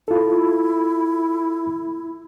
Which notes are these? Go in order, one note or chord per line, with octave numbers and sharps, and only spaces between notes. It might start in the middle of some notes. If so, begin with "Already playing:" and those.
E4 F4 A4